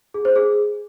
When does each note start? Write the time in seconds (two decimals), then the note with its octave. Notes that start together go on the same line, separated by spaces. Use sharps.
0.14 G#4
0.25 C5
0.36 G#4